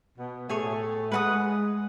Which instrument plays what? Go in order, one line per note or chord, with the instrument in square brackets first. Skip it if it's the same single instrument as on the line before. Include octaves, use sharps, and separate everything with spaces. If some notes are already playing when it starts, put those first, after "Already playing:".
[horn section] B2 B3
[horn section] A2 A3 [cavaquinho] G#4 C#5 G#5
[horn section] G#3 [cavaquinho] B4 F#5 A5 D#6